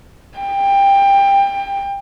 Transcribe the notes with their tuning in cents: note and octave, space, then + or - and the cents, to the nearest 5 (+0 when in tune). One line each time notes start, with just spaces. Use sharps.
G5 +20